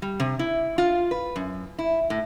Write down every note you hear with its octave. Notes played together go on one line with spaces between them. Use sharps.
G3
C3
E4
F4
B4
F#2
E4
A2